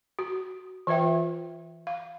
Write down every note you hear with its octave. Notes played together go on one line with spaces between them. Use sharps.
F#4
E3 F4 B4 E5 G5
F5